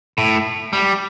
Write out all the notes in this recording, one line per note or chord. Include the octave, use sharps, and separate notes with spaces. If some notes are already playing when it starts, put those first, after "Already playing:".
A2
G3